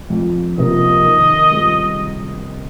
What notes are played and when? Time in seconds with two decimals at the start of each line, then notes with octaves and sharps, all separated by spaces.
0.10 F2
0.58 C3 F3 A#3 D#5
1.05 D#3
1.51 G3 C4 F4 G#4